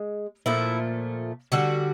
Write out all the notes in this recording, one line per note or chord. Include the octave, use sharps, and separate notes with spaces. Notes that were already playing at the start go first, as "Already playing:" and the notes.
Already playing: G#3
A#2 F3 A3 E4
D3 G3 F#4